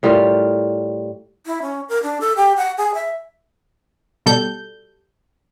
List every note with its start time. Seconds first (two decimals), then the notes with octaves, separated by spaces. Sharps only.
0.03 A2 G3 F4 A#4
1.46 E4
1.62 C#4
1.89 A#4
2.03 D4
2.21 A4
2.37 G4
2.57 F#5
2.78 G#4
2.95 E5
4.26 B2 G3 A4 G6